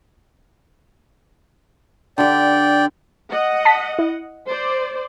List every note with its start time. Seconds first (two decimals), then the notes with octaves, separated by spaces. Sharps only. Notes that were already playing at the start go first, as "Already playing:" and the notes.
2.18 D3 G4 D5 G5
3.30 D#5 F#5
3.65 A5 B6
3.99 E4
4.49 C5 D5